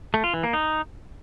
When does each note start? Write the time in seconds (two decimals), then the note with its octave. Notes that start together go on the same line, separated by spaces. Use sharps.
0.14 A3
0.24 F4
0.34 E3
0.43 A#3
0.53 D#4